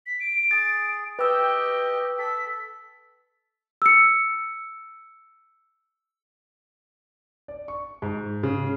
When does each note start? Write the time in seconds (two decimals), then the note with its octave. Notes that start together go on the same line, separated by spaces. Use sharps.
0.06 B6
0.20 D7
0.51 G#4 A6
1.19 G4 B4 D#5 G5 E6
2.19 A4 B6
3.82 E6 C#7
7.48 D5
7.68 C#6
8.02 G#2
8.43 C#3